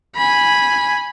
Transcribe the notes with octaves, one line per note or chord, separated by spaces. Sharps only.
G#5 B5